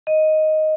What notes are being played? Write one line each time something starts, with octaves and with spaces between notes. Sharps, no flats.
D#5